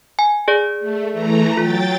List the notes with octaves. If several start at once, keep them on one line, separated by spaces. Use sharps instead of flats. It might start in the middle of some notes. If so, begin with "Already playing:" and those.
G#5
G#4 D5
A3
E3 A3 A#5
F#3 F4 G5 A6